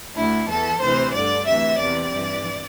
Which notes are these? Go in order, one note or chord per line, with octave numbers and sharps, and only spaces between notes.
D2 D3 E4
E2 E3 A4
D2 C3 E3 C5
G2 D3 D5
D2 C3 E3 E5
E2 C3 E3 D5
G2 E3